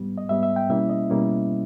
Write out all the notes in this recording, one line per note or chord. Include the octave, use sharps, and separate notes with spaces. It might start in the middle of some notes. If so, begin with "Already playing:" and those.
Already playing: G#2 G3 B3
D#5
G#2 G3 B3 E5
E5
G5
B2 G3 A#3 C#4 E4 E5
D#5
B2 G3 A#3 C#4 E4